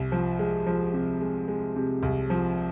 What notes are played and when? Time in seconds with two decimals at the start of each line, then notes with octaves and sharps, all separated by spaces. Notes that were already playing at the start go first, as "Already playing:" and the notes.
Already playing: C2
0.12 F3
0.39 G#3
0.66 F3
0.94 C3
1.21 G#3
1.48 G#3
1.76 C3
2.03 C2
2.30 F3